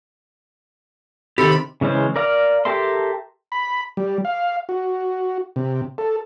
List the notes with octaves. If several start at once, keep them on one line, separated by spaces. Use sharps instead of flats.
C3 D#3 G4 A4 B5
C#3 E3 G#3 C#4 C5
A#4 D5 F5 A#5
G4 A4 A#4 E5 C6
B5
G3
F5
F#4
C3
A4